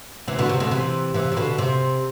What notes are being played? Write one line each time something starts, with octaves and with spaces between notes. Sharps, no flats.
C3 E3
B2 D3
C3
B2 D3
C3 E3
C3 E3
C3
B2 D3
C3